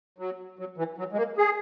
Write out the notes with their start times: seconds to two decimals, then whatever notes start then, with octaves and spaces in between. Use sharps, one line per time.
0.18 F#3
0.59 F#3
0.78 E3
0.98 F#3
1.12 G#3
1.17 A#3
1.38 G#4